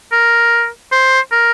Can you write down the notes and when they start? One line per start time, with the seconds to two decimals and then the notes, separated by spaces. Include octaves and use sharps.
0.12 A#4
0.92 C5
1.32 A#4